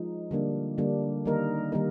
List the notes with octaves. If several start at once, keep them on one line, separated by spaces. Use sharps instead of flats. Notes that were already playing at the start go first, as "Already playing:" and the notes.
Already playing: F3 G#3 D#4
D3 G3 A#3 D4
D3 G3 A#3 D4
D#3 G3 A#3 D#4 A#4
D#3 G3 A#3 D#4 A#4